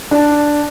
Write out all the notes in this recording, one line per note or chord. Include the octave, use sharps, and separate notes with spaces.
D4